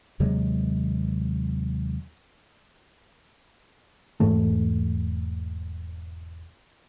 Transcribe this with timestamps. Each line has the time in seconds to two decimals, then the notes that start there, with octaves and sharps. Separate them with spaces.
0.20 D#2 C3 F#3 G#3
4.20 E1 G#2 E3 A3